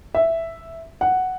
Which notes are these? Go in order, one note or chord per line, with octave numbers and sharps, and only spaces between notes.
E5
F#5